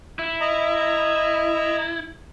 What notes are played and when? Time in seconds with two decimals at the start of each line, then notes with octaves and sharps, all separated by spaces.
0.19 E4
0.41 D#5 A#5